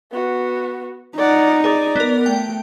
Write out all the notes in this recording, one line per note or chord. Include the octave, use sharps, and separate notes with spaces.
B3 F#4
D#4 D5 F#5
G#4 D5
B3 A#4
A3 G5